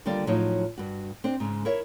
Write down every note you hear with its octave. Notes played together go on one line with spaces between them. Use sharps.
D#2 D3 G3 F4 D5
A2 F3 F#3 D#4 E4 C#5
G2 F#4
C4 D4 C5
G#2 C#3 G#3
E4 A#4 C#5 E5